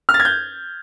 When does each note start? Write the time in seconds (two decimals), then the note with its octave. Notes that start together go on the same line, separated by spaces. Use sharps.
0.09 F6
0.14 A6
0.20 G#6
0.25 G6